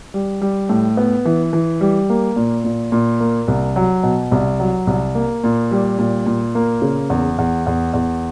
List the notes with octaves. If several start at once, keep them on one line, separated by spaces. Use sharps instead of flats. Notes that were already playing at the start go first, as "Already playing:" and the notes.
G3
G3
A2
B3
E3
E3
G3
A#3
A#2
A#2
A#2
A#3
C2
F#3
B2
C2
F#3
C2
A#3
A#2
G3
A#2
A#2
A#3
C#3
E2
E2
E2
E2